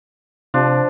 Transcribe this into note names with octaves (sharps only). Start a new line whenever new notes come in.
C3 F3 D4